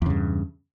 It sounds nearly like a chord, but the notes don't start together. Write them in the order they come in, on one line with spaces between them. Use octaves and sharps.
E2 C#3 G2